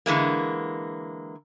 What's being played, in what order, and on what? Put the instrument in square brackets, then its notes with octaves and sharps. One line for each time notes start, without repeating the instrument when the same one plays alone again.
[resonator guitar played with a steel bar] D3 E3 G#3 A#3